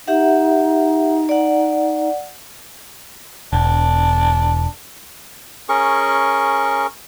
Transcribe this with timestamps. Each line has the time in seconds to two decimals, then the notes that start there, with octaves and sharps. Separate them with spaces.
0.07 D#4 G4 E5 F#5
1.29 D5 F#5
3.53 E1 D4
5.69 C#4 G#4 A#4 C#6